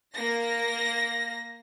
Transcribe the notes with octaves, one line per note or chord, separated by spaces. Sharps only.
A#3 A#6